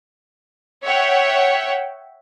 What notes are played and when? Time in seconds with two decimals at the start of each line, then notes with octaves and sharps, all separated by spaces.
0.83 C#5 E5 F#5 G5